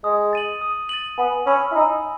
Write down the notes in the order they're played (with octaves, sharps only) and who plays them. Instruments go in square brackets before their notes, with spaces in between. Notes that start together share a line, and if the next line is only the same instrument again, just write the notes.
[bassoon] G#3 [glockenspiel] D#6
[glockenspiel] A6 D#7 F#7
D#6
A6 D#7 F#7
[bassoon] B3 [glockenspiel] G#5
[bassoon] C#4 [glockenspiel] B5 E6
[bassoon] E4
[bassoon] D#4 [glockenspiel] G#5